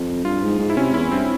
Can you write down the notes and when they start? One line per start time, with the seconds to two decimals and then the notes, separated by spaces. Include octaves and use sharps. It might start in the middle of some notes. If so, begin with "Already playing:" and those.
Already playing: F2
0.24 G2 F4
0.42 G#2
0.59 G#2
0.70 E4
0.77 C3 C#4
0.94 E2 E4
1.12 G2 C4